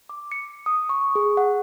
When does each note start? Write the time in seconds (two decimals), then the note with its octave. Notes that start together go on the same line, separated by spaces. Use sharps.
0.09 D6
0.32 C#7
0.66 D#6
0.89 C#6
1.15 G#4
1.37 F#5